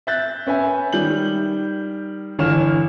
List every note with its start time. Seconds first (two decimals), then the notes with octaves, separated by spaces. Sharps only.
0.07 E5 F#6 G6 A6
0.47 C#4 B4 E5 G#5
0.92 D#3 G3 G6 F#7
2.39 G1 D3 E3 C#5 F6 E7